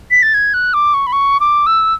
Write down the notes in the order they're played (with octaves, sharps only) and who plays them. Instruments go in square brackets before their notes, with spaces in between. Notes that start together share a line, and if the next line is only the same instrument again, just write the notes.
[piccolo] B6
A6
G#6
F#6
D6
C#6
B5
C#6
D6
E6